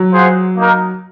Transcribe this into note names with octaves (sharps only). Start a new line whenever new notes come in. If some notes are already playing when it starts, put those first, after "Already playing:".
Already playing: F#3
F4 G#4 C5 F#5
A#3 D#4 A#4